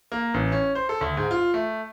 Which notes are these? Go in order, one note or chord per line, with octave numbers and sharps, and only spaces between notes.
A#3
A1
C#4
C5
A4
D2
G#2
F4
A3